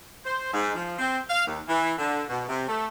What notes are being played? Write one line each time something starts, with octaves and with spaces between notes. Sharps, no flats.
C5
G#2
F3
C4
F5
D#2
E3
D3
B2
C3
A3